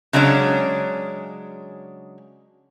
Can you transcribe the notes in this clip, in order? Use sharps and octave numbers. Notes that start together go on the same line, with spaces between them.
C#3 F#3 G#3 C#4 D4